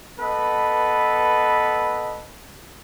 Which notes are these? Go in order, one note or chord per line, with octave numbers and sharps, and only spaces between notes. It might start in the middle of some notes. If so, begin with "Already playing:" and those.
B3 A4 B4 D#5